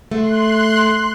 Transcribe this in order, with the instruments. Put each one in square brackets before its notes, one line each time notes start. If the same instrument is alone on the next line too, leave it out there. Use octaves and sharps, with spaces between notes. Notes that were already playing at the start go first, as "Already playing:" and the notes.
[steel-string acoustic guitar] A3 [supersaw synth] C6 F#6